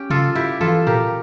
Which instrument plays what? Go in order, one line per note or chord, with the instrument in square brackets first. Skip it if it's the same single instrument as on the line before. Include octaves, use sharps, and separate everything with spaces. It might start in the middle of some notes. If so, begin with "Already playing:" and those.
Already playing: [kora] C#4 G4
[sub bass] C#3 [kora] F4 A4
[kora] E4 G4
[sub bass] E3 [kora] F4 A4
[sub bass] A#2 [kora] G4 A#4